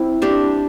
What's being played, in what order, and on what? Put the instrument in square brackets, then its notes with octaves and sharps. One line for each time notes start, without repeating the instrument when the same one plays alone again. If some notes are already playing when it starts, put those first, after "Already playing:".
Already playing: [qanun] C4 E4
D4 G4